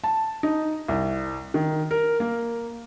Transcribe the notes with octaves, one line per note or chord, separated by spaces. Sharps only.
A5
D#4
C2
D#3
A#4
A#3